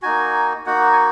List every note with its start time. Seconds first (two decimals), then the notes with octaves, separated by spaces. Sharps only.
0.02 A#3 D#4 F#4 G#5
0.66 A#3 D#4 F#4 F#5
0.92 G#5